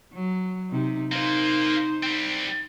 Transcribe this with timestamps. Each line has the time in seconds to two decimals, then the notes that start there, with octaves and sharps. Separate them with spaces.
0.13 F#3
0.70 C3 D#4
1.12 A#3 D#4 F4 C5
2.03 G3 C4